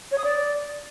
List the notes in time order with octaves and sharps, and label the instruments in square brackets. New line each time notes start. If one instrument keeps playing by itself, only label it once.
[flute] C#5
D#6
D5